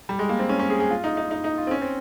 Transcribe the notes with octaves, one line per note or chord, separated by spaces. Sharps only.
G3
G#3
A#3
C4
C#4
C#4
G#4
G#4
F4
D#4
D#4
D#4
D#4
F4
C4
C#4
C4